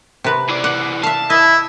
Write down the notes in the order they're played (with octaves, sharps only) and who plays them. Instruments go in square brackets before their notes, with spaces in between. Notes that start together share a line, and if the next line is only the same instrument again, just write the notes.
[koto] C3 B4
[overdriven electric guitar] E3 D5
[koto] F#5
[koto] E5 F5 [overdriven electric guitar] A5
[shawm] E4 [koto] D#5